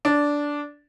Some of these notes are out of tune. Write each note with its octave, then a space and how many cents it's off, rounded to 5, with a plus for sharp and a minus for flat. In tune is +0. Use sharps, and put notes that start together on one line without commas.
D4 -10